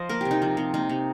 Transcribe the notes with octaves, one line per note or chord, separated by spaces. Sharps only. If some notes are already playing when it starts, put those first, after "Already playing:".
Already playing: F3 C5 D#5
A#3 A#4
C3 G4
D#4
F3
C3
A#3 D#4
C3